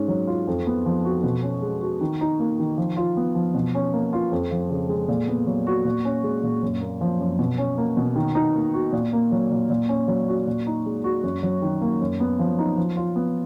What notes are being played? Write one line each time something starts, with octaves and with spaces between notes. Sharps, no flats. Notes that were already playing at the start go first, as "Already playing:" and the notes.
Already playing: G#2 C#4
F#3
F4
F2
B3
F3
F#4
B2
C#4
G#3
F#4
D#3
D#4
A#3
D#3
F3
F4
B3
F3
B2
C#4
A#3
F4
F2
F3
C#3
G#3
A#2
B3
F#3
F#4
A#2
C#4
G#3
A#2
F#2
A#3
F3
F#2
B2
C#4
A#3
B2
D#3
D#4
A#3
F#4
A#2
A#3
F#3
A#2
A#2
C#4
F#3
F#4
A#2
D#4
G#3
F#4
F#2
F#3
D#3
A#3
F#2
B3
F3
D#4
F3
F4
B3